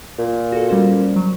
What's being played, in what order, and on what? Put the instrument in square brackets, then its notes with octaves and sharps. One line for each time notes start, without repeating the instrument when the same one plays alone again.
[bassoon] A#2
[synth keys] F#4 A4
G3 C#4 C5
F#3